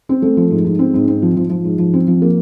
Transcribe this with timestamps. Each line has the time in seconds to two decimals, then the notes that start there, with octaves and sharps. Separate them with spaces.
0.09 C4
0.22 A3
0.37 F3
0.51 G#2
0.65 G#2
0.79 C4
0.94 G#2
1.07 C4
1.22 F3
1.36 F3
1.50 F3
1.64 G#2
1.78 F3
1.93 C4
2.08 F3
2.22 A#3